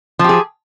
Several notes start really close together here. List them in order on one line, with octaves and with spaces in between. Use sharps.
F3 G4 G#4